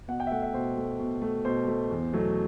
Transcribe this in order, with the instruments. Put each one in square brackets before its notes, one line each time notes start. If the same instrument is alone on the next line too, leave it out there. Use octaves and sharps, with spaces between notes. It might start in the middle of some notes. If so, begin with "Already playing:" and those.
[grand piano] B2 F#5
G5
E5
A3 F#5
E5
B2 C5
A3
B2
A3
B2 C5
A3
E2
B2 F#3 A3